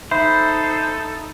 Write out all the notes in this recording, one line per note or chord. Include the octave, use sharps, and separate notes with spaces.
D#4 A4 C5 E5 B5